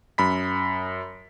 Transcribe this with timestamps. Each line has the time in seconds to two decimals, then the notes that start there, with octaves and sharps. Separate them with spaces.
0.18 F#2 B5 B6